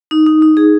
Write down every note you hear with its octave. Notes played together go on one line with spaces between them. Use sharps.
D#4
D#4
D#4
G#4